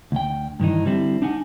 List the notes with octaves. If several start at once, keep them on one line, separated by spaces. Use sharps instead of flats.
D2 G5
G2 D#3 E3 D#4
D3 G3 C4 E4
D4 D#4 F#5 G#5